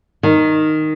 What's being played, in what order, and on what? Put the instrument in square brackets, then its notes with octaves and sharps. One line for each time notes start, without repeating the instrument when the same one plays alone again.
[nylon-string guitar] D#3